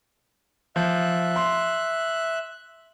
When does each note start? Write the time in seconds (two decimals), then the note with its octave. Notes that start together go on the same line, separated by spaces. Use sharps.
0.76 F3 E5 F#6
1.36 C6